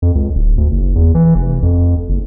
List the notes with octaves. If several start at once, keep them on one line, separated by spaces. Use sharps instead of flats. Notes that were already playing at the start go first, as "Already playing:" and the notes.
F2
C#2
D1
D2
F#1
E2
E3
F1
F2
F#1